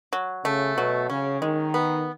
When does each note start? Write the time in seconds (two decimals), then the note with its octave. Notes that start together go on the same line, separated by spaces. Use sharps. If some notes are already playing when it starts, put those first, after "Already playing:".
0.13 F#3
0.44 C#3 A3
0.77 B2 F#3
1.10 C#3 C#4
1.42 D#3 G#3
1.74 B3